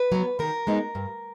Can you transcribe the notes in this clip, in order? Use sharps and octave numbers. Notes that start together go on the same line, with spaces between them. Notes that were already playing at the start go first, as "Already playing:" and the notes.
Already playing: B4
F#3 B3
D#3 A#4
G#3 B3 D#4
G2